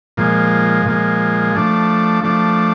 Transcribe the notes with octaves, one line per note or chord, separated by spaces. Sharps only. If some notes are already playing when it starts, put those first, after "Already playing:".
A#2 F3 G#3
A#2 F3 G#3
F3 A3 D4
F3 A3 D4